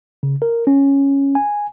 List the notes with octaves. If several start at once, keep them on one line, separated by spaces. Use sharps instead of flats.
C#3
A#4
C#4
G#5